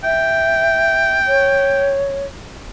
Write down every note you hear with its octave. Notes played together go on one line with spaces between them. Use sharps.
E5 G5
C#5